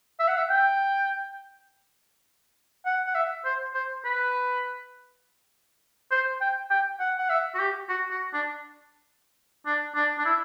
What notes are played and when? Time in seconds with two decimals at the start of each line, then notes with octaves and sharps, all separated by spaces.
0.20 E5
0.28 F#5
0.37 E5
0.49 G5
2.86 F#5
3.07 F#5
3.15 E5
3.45 C5
3.74 C5
4.04 B4
6.11 C5
6.41 G5
6.70 G5
7.00 F#5
7.18 F#5
7.29 E5
7.55 F#4
7.59 G4
7.89 F#4
8.11 F#4
8.33 D4
9.66 D4
9.95 D4
10.18 D4
10.25 E4